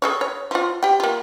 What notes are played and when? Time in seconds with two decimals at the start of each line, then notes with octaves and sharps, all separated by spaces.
0.02 G#4 A4 C#5
0.21 C#5
0.51 F3 F4
0.83 G4 G5
1.00 A#3 F4